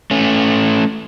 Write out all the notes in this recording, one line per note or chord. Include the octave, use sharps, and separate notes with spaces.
A3 C#4